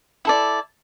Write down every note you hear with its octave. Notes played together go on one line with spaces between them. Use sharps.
E4 A4 D5